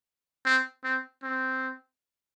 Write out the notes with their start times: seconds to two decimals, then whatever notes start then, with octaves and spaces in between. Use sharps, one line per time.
0.45 C4
0.84 C4
1.23 C4